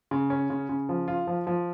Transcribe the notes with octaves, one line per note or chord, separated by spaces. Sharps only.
C#3
C#4
C#3
C#3
F3
F4
F3
F3